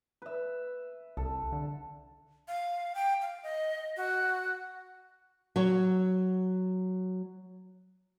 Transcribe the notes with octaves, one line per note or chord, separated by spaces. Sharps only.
B4 E5
C2 A4
D3
F5
G5
F5
D#5
F#4
F#3 C#5